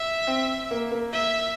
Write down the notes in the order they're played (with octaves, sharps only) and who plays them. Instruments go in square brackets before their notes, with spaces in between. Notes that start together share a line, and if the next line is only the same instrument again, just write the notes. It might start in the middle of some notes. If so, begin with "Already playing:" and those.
Already playing: [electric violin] E5
[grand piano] C4
A#3
A#3
[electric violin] E5